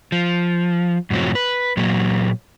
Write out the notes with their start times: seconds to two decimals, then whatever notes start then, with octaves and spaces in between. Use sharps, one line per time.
0.12 F3
1.10 F#2 A2 C3 F3 F#3
1.35 B4
1.77 A#2 F#3 A#3